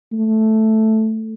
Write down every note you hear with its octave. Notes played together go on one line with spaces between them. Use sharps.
A3